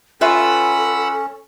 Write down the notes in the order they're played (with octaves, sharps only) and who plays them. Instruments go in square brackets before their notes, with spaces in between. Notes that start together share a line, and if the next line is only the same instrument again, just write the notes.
[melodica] C#4 [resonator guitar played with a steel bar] F4 B4 E5 [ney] A4 [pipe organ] F#5 B5 E6